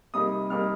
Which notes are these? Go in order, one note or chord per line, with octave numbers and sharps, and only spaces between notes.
C3 G3 A#3 D#4 D#6
C3 G3 A#3 D#4 F6